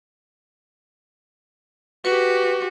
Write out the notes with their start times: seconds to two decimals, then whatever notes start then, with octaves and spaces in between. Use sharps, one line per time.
2.05 F#4 G4 B4